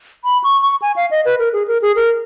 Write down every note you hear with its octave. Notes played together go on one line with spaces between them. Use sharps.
B5
C#6
C#6
G#5
F5
D#5
B4
A#4
G#4
A#4
G#4
A#4